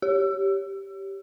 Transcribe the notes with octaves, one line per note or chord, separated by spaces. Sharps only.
G4